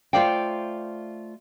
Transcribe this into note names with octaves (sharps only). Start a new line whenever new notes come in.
A3 F4 C5 D5 F5 G5